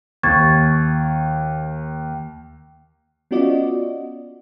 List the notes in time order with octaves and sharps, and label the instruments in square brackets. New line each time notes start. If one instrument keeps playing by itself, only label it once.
[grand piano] D#2 [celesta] C#6 G#6 A6
[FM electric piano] B3 C#4 F4 F#4 D5 D#5